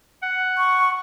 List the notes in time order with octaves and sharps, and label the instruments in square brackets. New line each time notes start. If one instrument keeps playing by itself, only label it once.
[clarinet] F#5
[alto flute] C#6